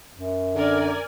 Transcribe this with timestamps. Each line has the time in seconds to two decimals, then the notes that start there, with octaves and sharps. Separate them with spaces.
0.15 F#2
0.55 D3 A#4 D5 G#5